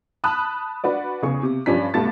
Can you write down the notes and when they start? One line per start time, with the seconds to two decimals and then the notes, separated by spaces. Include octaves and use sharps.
0.24 A5 B5 D#6 F#6
0.84 D4 F#4 B4 D5
1.22 E2 C#3 G#4 C#6
1.43 C3
1.66 G2 F3 C#4 D4 B6
1.94 C2 G2 B2 A3 A5 A6